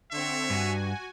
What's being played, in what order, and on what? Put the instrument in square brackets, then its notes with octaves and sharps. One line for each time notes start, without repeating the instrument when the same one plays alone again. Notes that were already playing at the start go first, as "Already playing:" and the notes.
[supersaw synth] D3 C4 [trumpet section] C#5 E5
[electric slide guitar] G2 [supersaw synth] F#4 G#5